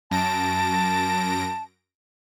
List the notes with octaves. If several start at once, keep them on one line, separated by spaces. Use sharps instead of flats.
F#2 A5 A#6 D7